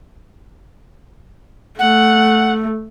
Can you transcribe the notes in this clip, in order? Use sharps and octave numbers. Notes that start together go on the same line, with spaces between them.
A3 F#5